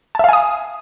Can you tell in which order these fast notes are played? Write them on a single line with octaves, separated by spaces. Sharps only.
A5 E5 F5 G#5 D#6